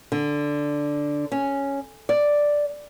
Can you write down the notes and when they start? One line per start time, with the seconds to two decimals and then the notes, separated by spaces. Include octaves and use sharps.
0.12 D3
1.32 C#4
2.09 D5